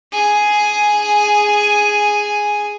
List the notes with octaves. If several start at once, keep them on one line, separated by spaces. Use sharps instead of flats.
G#4 G#5